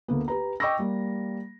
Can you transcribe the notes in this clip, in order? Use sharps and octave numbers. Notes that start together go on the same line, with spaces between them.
D2 A#3 B3
G4 B4 A#5
D#5 G5 C#6 D6 E6 A#6
G3 A#3